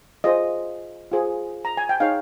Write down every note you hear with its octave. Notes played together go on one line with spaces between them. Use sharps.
F4 G#4 C5 D#5
F4 G#4 C5
A#5
G#5
G5
D#4 G#4 C#5 F5